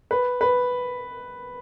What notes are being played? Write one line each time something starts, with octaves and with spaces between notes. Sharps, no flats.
B4
B4